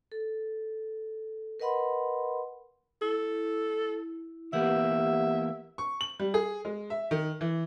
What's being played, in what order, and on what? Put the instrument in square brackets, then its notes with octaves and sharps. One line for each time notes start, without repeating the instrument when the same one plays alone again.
[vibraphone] A4
A#4 B4 D#5 F#5 B5 C6
[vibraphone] E4 [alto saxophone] A4
[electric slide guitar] E3 A#3 B3 [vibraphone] G4 F#5 [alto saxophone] E5
[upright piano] C#6
F#7
G3
G#4
G#3
E5
D#3
E3